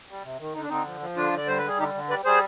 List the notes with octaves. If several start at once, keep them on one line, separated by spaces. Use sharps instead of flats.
G3
C3
D#3
D3 D#4
D4
D3 C4 D#4
F3
F3
D3 D4 F4
D3 D5
G3 C5
B4
G3 G#4
D3 D#4 G4
D3
G3 B4 D5
G3 G#4 C5